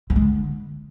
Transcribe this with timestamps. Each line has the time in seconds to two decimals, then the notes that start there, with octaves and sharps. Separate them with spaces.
0.10 F3
0.16 G#3
0.22 D3